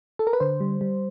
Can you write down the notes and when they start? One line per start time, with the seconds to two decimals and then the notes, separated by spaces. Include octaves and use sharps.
0.19 A4
0.27 A#4
0.33 B4
0.40 D3 C5
0.60 G3
0.81 G3